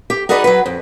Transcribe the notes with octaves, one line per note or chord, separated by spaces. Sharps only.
G4
D#4 F#4 G#4 B4 D5 D#5
F#3 B4
F2